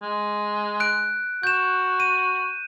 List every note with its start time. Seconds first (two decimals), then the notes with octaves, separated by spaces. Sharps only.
0.02 G#3
0.80 F#6 D7
1.43 F#4 G6 E7
2.00 D#7